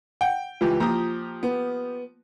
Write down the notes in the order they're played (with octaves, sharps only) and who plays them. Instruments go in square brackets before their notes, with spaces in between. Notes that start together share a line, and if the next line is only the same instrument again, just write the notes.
[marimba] F#5 [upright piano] G5
[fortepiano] C#2 E3 G4 [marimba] F4
[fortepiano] F3 G4 D#6 [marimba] A#3 [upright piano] A#5
[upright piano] B3